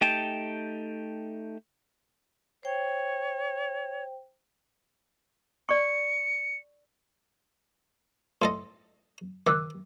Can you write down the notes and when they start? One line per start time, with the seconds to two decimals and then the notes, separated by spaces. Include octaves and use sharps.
0.01 A3 D#4 G4 G5 A5
2.63 C5 C#5 G5
5.69 D5 C#6 C#7
8.42 A2 A4 D#5 C6
9.47 D#3 D6 E6 F#6